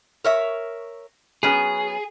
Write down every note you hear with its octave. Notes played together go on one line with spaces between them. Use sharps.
A#4 C#5 E5
F#3 B3 C#4 G#4